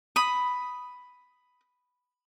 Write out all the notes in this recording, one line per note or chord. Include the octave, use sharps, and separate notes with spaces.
B5 D#6